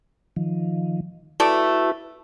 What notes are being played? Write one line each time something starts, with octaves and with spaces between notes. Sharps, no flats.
D#3 F3
A3 E4 F#4 A4 B4 D5